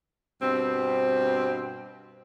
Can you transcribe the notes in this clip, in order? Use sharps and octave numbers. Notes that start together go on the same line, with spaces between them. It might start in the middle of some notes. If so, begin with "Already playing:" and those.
G2 B2 C4